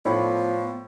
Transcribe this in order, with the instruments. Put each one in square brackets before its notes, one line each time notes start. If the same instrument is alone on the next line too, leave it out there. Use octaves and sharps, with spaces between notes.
[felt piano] A2 [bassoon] F3 [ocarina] B3 [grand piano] C#5 D5 B5